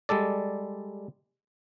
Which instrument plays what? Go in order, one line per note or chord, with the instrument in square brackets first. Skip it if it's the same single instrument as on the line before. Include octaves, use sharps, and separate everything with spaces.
[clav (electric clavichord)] G3 G#3 A4 D5